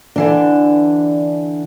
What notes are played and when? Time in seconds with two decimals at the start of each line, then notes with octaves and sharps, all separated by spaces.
0.16 D3 E3 D4